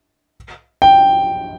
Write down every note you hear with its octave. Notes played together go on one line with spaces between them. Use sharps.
G5